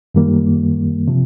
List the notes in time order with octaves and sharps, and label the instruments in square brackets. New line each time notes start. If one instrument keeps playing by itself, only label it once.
[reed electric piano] F#2 D#3 G3 A#3
C3 F3